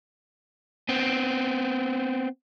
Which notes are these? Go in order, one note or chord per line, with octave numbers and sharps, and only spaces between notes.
B3 C4